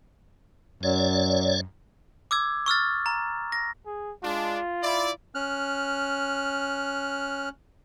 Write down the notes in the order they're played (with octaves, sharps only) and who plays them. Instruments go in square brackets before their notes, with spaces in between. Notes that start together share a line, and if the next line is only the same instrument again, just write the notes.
[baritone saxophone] F#2 [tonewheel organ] C#5 D5
[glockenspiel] D6 E6 G#6
C#6 E6 F6 A6
A#5
A#6
[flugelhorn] G#4
[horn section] G#3 D4 [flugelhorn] F4
[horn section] E4 D5
[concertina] C#4 F6 F#6